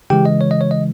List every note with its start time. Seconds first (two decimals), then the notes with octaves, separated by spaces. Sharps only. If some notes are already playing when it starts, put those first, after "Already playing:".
0.10 C#3 E3 G#3 G4 G5
0.26 D#5
0.41 C#5
0.51 D#5
0.61 C#5
0.71 D#5